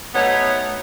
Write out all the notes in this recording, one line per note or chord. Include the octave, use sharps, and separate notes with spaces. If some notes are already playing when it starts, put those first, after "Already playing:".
B2 A3 B3 D#4 C#5 F#5